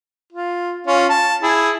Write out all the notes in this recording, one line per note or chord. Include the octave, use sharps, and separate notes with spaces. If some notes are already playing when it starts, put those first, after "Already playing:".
F4
C#4 F4
A5
E4 G#4